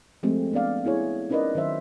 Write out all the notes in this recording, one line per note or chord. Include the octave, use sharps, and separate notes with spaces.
F3 G#3 A3 C4 G4
B3 D4 D5 F5
B3 E4 G#4 C#5
C#4 D#4 A#4 B4 D5 D#5
D#3 F#3 C5 E5